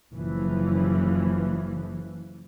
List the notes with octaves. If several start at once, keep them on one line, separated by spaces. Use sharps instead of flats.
F#1 E3 F3